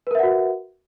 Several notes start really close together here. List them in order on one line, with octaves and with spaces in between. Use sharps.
B4 A#4 E5 F#5 F#4